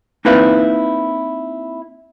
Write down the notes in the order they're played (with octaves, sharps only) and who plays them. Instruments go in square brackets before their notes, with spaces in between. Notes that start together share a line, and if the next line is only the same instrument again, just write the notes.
[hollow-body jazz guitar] A#3 C4 D#4 E4 B4 F5